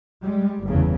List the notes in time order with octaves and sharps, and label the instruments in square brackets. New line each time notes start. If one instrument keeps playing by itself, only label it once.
[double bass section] G3 G#3
G1 E2 C#3